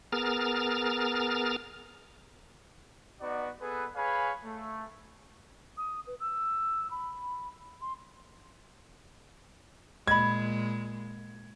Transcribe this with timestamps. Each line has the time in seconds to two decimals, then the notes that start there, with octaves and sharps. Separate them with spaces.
0.12 B3 G#4 A#4 A#5 F6 A6
3.20 B3 D#4 F#4 D5
3.61 B3 G#4 A4 B4
3.95 G#4 B4 C#5 F5 G#5 B5
4.44 A3
5.77 D#6
6.07 B4
6.20 E6
6.91 B5
7.81 C6
10.07 A#2 G#3 D#5 B5 G#6